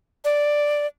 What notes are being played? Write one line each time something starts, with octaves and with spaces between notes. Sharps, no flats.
D5